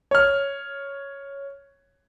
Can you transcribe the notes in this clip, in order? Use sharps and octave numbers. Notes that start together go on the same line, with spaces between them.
C#5 F6